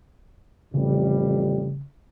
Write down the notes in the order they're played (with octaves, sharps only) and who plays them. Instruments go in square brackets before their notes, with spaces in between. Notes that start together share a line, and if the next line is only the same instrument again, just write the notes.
[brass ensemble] A1 F2 G3 [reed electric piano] C#3